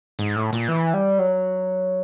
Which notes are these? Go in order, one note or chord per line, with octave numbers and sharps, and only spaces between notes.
G#2
A2
A#2
E3
G3
F#3